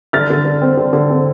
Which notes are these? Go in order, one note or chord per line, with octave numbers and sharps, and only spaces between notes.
D3 F6 A6
D3
D3
C4
D3
D3
C4